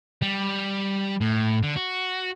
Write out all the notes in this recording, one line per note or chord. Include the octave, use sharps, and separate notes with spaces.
G3
A2
D3
F#4